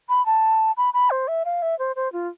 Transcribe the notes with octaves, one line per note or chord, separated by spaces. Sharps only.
B5
A5
B5
B5
C5
E5
F5
E5
C5
C5
F4